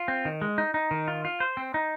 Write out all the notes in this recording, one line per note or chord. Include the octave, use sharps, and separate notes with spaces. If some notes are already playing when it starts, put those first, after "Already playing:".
Already playing: F4
C4
D#3
G#3
D#4
D#4
D#3
F4
F4
C5
C4
D#4